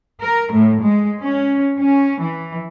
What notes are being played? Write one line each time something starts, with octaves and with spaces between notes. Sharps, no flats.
A#4
A2
G#3
C#4
C#4
E3